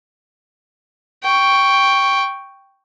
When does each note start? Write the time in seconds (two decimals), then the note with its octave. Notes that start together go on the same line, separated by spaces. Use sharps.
1.23 G5 C#6